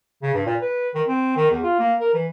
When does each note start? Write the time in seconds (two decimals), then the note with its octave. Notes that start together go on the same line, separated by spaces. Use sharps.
0.22 C#3
0.34 G2
0.46 A#2
0.61 B4
0.94 D#3
1.08 C4
1.36 D#3
1.51 E2
1.63 F4
1.79 A#3
2.00 A#4
2.14 E3